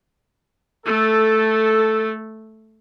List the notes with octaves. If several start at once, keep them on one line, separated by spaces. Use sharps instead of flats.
A3 A4